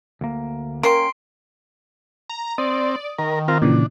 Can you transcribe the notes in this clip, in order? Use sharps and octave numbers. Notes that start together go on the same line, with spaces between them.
D2 A#3
A#3 C#4 A#4 G5 C6 C7 D7
A#5
C4 D5 D#6
D#3 A#4
C4 F4 A#4
A#2 C#3 E3 D4